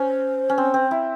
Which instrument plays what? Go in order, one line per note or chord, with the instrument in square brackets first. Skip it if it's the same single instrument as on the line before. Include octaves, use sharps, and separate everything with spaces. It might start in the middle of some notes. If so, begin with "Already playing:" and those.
Already playing: [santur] C#4 [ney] C5
[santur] C#4
C4
C4
E4